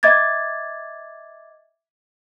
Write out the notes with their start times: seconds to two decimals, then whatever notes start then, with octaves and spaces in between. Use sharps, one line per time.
0.03 D#5 E5 D6 G#6 A6